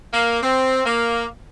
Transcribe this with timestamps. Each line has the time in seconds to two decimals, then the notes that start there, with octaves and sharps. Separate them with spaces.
0.13 A#3
0.42 C4
0.86 A#3